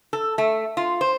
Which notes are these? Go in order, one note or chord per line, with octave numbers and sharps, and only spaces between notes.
A4
A3
F4
C5